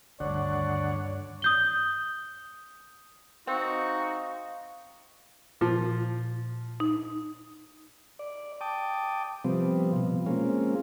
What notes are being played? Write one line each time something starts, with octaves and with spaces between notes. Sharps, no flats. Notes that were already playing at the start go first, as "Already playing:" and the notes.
D2 G2 D3 D#3 C#5 D5 F#5
D#6 G6 G7
C4 D#4 F#4 F5
A#2 F3
D#4
D5
G5 A5 D6 D#6
C3 F3 G3 B3 C4
B2 F3
G#3 A#3 C4 C#4 F4